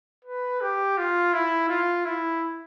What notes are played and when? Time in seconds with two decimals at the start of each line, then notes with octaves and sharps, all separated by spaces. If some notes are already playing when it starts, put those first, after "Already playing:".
0.25 B4
0.61 G4
0.98 F4
1.33 E4
1.69 F4
2.05 E4